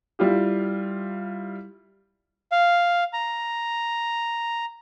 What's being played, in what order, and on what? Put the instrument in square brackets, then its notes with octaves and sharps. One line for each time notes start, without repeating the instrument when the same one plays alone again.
[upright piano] G3 E4 F4 G4
[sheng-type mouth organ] F5
A#5